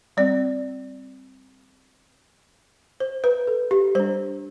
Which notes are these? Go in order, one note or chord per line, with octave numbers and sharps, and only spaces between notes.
G3 C4 D5
C5
B4
A4
G4
G3 D4 C5